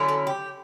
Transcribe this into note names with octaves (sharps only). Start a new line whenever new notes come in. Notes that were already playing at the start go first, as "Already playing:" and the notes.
Already playing: D3 F#3 C#4 E4
A4
G4